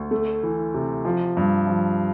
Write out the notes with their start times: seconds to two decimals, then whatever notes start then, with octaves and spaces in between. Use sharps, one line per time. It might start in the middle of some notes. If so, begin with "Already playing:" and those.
Already playing: D2
0.11 A3
0.43 E3
0.74 C3
1.05 F3
1.37 G2
1.67 F3